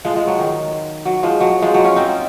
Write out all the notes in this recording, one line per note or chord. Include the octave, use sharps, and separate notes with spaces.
F3 G#3
F3 G#3
F#3
D#3
F#3
F3 G#3
F#3
F3 G#3
F#3
C#4 F4
C4 D#4